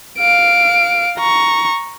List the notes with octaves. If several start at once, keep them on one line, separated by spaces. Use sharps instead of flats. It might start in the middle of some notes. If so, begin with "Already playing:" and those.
F5 D7
A#5 C#6